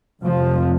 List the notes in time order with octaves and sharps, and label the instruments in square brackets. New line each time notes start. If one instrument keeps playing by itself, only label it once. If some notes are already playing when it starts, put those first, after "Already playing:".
[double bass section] F1 F2 C3 F3